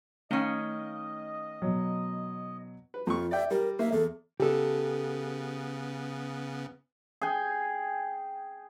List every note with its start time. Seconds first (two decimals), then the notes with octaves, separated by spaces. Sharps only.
0.31 D#3 A3 C#4 D#5 F5 G7
1.62 B2 F#3
2.94 B4
3.07 F2 F4 C#6
3.31 D5 E5 G5
3.51 G3 A#4
3.79 A#3 E5
3.92 E2 A4
4.40 C#3 B3 G4 A4
7.21 G#4 G5 G#5